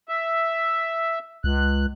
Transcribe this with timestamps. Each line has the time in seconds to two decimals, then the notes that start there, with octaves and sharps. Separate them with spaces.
0.09 E5
1.44 C#2 F#6